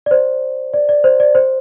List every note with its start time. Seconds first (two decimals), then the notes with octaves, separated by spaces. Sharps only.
0.06 D5
0.11 C5
0.74 D5
0.89 D5
1.04 C5
1.20 D5
1.35 C5